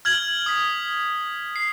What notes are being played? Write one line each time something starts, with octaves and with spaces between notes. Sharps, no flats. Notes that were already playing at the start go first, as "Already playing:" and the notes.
F6 G#6 F#7
D#6 B6
C7